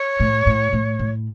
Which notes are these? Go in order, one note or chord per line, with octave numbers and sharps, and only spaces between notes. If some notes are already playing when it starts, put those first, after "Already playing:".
Already playing: C#5
A2
A2
A2
A2